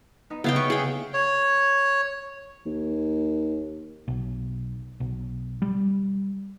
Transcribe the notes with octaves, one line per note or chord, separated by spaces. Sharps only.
B3 D#4
C#3 B3 E5 F5 G5
C#6 D#7
G#4 E5 G5
C#5
D#2
B1
B1
G3